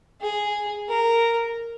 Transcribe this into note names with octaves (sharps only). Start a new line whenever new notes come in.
G#4
A#4